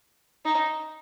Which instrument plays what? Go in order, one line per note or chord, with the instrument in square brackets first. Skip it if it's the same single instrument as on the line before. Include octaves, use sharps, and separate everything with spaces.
[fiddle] D#4